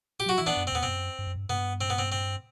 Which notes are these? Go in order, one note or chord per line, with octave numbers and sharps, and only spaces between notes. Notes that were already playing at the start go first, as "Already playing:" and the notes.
G4
F#3 F#4
E3 E4
B3 D4
F#2
C4
E2 B3
C4
F#2
G2
F#2
G2
G2 B3
C4
B3
C4
C4